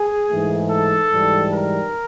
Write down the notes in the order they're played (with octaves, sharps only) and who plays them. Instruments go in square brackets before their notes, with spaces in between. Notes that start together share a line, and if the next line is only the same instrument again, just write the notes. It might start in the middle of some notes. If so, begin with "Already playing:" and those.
Already playing: [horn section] G#4
G#2 E3 A3
A4
G#2 E3 G3
A#4